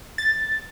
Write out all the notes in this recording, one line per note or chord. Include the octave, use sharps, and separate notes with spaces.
A6